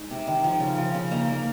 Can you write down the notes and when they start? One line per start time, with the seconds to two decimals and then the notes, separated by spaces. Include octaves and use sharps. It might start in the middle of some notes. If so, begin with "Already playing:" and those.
Already playing: G#3 D#4
0.10 C3
0.27 D#3
0.44 F3
0.60 C#3
0.78 F3
0.95 C#3
1.11 A#3 D#4
1.29 A#3